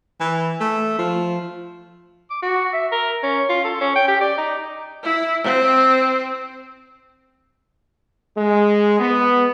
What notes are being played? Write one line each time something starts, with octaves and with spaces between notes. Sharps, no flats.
E3
A3
F3
D6
F#4
E5
A#4
C#4
F4
A4
C#4
G5
G4
D5
D#4
E4
C4
G#3
B3